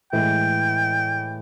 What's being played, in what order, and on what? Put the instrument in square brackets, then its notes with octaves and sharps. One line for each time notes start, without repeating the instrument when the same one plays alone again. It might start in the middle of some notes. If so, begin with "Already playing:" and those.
[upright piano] A2 E3 G#3 [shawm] G5